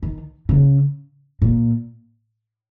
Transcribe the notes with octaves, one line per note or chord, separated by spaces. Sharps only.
D#3
C#3
A#2